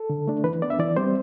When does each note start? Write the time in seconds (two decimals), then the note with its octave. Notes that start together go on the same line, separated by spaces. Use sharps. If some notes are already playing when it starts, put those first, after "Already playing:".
Already playing: A4
0.10 D3
0.27 A3 D4
0.44 E3 B4
0.62 B3 D4 D5
0.70 E5
0.79 E3 D5
0.97 G3 C4 C5